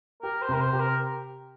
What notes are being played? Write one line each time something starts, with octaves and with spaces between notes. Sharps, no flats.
G4 A#4
C5
C3 A#4
C5
G4
A#4